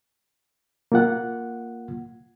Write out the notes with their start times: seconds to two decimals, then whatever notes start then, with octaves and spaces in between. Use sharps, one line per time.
0.92 A#3 F4 F#5